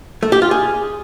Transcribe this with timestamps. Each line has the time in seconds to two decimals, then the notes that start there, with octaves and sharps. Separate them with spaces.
0.23 A3
0.32 G4
0.42 F4
0.51 G#4